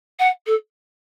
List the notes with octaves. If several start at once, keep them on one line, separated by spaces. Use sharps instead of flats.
F#5
A4